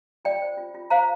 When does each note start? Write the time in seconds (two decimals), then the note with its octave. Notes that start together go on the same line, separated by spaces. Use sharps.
0.25 F4 D5 G5
0.42 C5
0.57 F4
0.75 F4
0.90 C5 F5 A#5